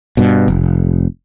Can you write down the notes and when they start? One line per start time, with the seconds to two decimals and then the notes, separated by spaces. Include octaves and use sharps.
0.17 G2 B2
0.48 F1